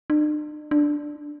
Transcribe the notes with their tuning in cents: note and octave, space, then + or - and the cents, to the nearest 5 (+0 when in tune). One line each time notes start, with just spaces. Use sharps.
D4 +45
D4 +5